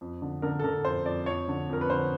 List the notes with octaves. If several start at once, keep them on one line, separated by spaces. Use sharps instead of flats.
F2
D3
D3 A#4
A4
D3 A#4
F2 C5
F2 D5
F2 C#5
D3
F2 A#4
B4
D3 C5